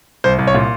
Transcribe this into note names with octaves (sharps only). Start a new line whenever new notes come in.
C2 C5
C2
C#5
A#2